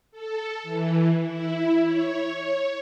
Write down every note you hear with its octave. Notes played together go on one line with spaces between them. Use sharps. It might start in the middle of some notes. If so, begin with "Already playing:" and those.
A4
E3
E4
C#5